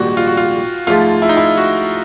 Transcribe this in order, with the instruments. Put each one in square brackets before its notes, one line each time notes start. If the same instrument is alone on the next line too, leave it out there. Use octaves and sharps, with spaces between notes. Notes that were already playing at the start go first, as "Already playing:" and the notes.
Already playing: [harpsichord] A#1 G#2 D#3 G3 [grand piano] F#4 G4
[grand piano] F4
F#4
F4
[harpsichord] G#2 F3 A3 [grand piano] F4
[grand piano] E4
D#4
E4
F#4